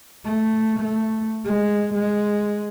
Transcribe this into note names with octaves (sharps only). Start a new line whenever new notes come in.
A3
A3
G#3
G#3